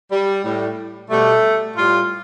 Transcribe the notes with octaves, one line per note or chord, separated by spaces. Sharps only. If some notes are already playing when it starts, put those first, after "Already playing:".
G3
A2 G3
B2 G3 A3
A2 G3 F4